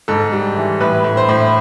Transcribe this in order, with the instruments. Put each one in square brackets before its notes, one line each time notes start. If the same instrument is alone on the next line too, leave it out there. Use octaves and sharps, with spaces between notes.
[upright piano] G#2 A4
G3
E3
A2 B4
A2
C5
A2